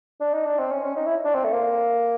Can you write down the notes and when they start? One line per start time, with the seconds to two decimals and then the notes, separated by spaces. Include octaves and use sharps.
0.21 D4
0.34 D#4
0.46 D4
0.59 C4
0.72 C#4
0.84 C#4
0.97 D#4
1.06 E4
1.25 D4
1.35 C4
1.45 A3
1.53 A#3